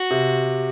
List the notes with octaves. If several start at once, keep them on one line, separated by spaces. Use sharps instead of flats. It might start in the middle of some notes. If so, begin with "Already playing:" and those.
Already playing: F#4
C3